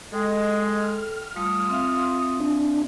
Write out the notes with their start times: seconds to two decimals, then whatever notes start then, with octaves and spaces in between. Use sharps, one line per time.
0.12 G#3 A4 G5
0.81 F6
1.36 G3 A3 F4 D#6
1.69 C4 E5 F5
2.40 D4